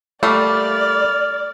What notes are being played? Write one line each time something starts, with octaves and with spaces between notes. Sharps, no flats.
G3 A3 A#3 D5 F6